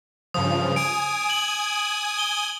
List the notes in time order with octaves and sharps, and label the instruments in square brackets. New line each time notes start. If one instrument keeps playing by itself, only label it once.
[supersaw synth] G2 C#3 F3 [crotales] D#6
[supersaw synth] G#5 D#6 [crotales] D7
[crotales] F#7
G7